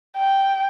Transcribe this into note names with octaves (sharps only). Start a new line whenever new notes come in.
G5